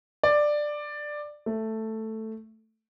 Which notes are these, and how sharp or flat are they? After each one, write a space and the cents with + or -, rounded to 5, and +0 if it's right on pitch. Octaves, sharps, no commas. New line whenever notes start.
D5 +10
A3 +5